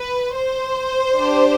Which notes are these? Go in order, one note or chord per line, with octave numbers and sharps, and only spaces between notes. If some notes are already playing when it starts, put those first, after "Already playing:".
Already playing: B4
C5
D4 G4